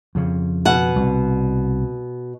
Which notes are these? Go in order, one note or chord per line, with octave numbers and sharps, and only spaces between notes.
F2 C#3
B2 F#5
C2